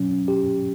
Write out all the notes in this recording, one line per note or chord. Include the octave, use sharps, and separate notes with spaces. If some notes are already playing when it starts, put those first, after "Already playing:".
Already playing: B2 F#3 C#4
G4